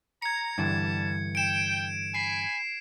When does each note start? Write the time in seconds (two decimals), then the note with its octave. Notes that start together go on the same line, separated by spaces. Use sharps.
0.22 A#5 G#6 C#7
0.58 G2 D3 E3 G3 A5
1.35 G5 D7 E7
2.15 G#5 B5 C7